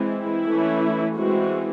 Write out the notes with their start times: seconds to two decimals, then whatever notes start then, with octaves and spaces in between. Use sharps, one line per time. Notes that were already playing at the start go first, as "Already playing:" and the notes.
Already playing: E3 G#3 C4
0.11 E4
0.45 E3 A3 C#4
1.17 E3 G#3 C4 F#4